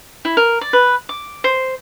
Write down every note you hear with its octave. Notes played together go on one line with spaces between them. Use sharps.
E4
A#4
D5
B4
D6
C5